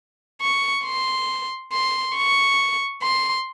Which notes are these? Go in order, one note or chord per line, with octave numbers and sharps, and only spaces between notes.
C#6
C6
C6
C#6
C6